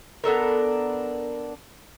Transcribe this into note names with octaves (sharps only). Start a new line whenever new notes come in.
B3 D4 A4 A#4